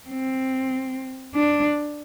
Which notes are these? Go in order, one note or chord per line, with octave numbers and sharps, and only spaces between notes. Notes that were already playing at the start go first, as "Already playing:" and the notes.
C4
D4